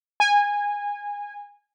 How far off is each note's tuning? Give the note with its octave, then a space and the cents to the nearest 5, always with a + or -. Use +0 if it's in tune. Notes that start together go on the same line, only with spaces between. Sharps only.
G#5 -20